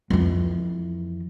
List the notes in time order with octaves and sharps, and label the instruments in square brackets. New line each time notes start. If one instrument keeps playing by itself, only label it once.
[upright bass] F2 E3